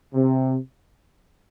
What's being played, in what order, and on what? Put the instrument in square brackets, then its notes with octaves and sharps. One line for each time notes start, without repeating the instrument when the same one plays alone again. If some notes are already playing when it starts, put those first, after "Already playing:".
[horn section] C3